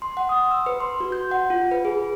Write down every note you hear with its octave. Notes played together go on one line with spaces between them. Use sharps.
C6
F#5
D#6
E6
B4
C6
F#4
G6
F#5
F4
B4
G#4